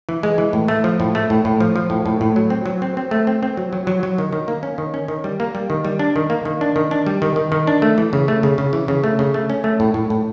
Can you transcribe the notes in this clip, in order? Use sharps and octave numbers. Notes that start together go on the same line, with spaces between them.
E3
G#3
E3
A2
A3
F3
A2
A3
A2
A2
F3
F3
A2
A2
A2
F#3
C4
F#3
C4
C4
A3
C4
C4
F#3
F#3
F#3
F#3
D#3
D#3
A#3
C#4
D#3
C#4
D#3
G3
A#3
G3
D#3
G3
D4
D#3
A#3
D#3
D4
D#3
D4
G3
D#3
D#3
D#3
D4
A3
E3
C#3
A3
C#3
C#3
E3
C#3
A3
C#3
A3
C#4
A3
A2
A2
A2